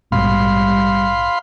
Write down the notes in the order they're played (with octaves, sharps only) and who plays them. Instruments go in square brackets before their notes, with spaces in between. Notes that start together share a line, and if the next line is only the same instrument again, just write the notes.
[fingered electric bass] A#1 G#2 B2 [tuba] G3 [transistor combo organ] F5 B5 C6